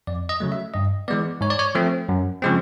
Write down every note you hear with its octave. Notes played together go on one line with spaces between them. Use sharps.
F2 D5
D#5
C#3 F#3 A3
E5
G2 D#5
E3 G#3 B3 D5
G#2 C#5
D5
C#5
F3 A3 C4
F#2
C#3 F3 G#3 C4